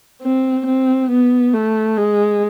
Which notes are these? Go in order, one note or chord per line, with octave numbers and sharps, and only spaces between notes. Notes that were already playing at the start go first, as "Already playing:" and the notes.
C4
C4
B3
A3
G#3